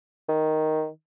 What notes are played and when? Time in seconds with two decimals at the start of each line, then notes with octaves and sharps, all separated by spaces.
0.29 D#3